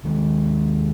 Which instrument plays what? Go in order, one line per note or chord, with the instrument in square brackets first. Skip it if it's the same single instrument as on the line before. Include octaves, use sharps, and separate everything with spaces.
[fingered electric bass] D#2 D#3 G#3